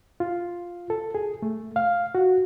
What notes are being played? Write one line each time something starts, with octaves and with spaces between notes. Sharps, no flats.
F4
A4
G#4
A3
F5
F#4